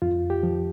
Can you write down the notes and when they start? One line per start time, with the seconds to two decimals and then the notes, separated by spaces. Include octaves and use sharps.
0.02 F2 F4
0.30 G4
0.43 F3